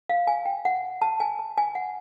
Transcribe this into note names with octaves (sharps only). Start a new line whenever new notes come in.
F5
G#5
G5
F#5
A5
G#5
A5
G#5
F#5